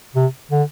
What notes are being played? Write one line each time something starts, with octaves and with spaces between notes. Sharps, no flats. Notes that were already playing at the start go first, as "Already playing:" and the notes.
C3
D3